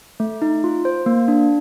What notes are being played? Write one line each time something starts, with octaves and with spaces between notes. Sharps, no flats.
A3
D#4
F4
C5
A#3
D4